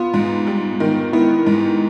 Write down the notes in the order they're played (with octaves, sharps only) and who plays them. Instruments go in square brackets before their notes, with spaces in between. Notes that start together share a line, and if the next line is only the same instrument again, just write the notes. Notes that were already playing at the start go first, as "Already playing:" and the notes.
Already playing: [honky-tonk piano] B3 [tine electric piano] F4
[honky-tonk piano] G#2
G3
D#3
[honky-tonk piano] B3 [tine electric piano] E4
[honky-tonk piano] G#2